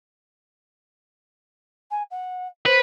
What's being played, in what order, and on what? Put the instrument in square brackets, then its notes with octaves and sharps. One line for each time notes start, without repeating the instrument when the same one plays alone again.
[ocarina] G#5
F#5
[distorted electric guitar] B4 [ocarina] C5